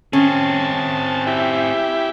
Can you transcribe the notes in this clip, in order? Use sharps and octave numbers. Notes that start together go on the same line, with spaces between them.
C4 C#4 G#4 A5
E4 G4